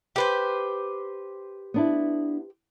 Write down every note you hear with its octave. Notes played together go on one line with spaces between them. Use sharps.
G4 B4 C5
B3 D4 E4